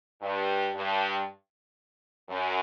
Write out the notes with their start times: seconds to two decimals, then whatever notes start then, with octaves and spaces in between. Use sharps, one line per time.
0.22 G2
0.74 G2
2.29 F#2